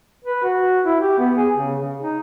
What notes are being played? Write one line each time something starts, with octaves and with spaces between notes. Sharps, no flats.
B4
F#4
E4
G4
B3
G#4
C#3
C#3
D#4